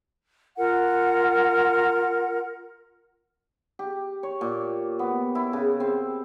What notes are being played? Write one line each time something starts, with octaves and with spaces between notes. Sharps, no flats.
F4 A#4 F#5
G4
C#5
A#2
B3
E4
C#3
C4